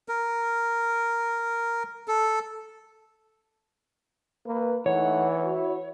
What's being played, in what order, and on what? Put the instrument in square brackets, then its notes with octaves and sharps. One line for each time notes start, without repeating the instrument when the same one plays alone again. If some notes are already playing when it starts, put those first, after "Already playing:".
[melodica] A#4
A4
[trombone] A#3 [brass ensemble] B4
[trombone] E3 [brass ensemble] A3 D#4 F#5 [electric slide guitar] C#5
[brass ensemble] E4 F#4